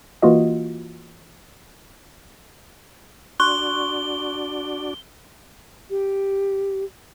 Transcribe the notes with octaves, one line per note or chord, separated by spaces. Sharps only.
E3 A#3 F4 F#4 D#5
D4 F#4 D5 C6 C#6 F#6 G7
G4